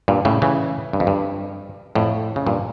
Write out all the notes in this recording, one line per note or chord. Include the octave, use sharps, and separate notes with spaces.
G2 A#2
A2 C#3
C#3 E3
G2
F2
G2
F2 A2
C#3
G2 A#2